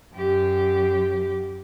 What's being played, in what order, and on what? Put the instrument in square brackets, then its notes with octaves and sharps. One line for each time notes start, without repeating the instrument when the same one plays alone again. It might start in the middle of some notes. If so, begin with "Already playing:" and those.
[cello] F#2 G4